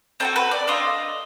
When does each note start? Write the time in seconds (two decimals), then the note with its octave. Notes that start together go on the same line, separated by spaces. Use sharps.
0.20 C4 D#4 F#4 A4
0.36 B4
0.51 D5
0.67 D4 F4 A4 D#5